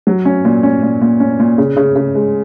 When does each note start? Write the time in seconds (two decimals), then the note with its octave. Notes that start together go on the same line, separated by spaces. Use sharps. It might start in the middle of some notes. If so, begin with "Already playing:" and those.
0.07 F#3
0.25 C#4
0.45 A#2
0.63 C#4
0.83 A#2
1.01 A#2
1.20 C#4
1.40 A#2
1.58 C#3
1.76 C#3
1.96 C#3
2.15 G#3